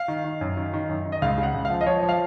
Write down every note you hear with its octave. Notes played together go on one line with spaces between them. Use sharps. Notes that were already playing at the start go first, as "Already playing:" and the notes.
Already playing: F5
D#3
D#3
F#2
D#3
D#3
F#2
D#3
D#5
C#2 F5
C#3
F#5
C#2
F5
F3
D#5
F3 C#5
F3
F5